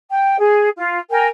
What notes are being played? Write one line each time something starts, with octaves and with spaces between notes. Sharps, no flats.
G5
G#4
F4
A#4 G5 G#5